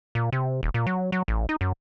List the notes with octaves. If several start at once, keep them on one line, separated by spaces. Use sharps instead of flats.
A#2
C3
D#1
A#2
F#3
F#3
A1
D#4
F#2